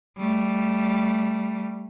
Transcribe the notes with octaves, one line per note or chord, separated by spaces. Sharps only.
G3 A3